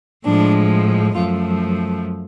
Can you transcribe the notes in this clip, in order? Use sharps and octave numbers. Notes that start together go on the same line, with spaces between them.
A2 F3 G#3 D4
F#2 F3 A3 F4